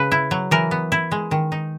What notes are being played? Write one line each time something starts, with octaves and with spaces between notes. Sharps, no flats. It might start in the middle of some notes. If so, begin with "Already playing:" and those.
Already playing: C#3 B4
E4
F#3
E3 A#4
B3
E4
G#3
D#3
D#4